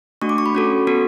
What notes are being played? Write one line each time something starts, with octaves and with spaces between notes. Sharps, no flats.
A3 D4 F#4 C#6
D6
C#6
B5
C#4 F#4 A4
B3 F#4 A4